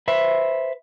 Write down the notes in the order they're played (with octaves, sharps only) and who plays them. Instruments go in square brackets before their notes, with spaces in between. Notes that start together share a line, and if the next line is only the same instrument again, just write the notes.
[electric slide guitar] B4 C5 E5